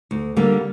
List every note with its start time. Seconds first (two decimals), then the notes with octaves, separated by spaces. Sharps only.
0.11 D2
0.36 D3 G3 A#3